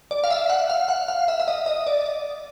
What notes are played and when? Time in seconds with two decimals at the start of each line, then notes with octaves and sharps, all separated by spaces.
0.11 D5
0.24 F5
0.30 E5
0.50 F#5
0.70 F5
0.89 F#5
1.08 F5
1.28 E5
1.40 E5
1.48 D#5
1.66 D#5
1.87 D5